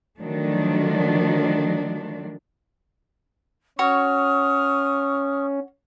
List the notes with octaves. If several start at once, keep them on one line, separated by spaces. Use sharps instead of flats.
D3 D#3 F3 F#3 A3 D4
C#4 F#4 C#5 C#6 D#6 F6